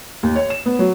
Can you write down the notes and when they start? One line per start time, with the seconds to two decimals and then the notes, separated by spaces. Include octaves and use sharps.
0.23 D#2
0.36 C#5
0.50 E7
0.66 B3
0.79 F#3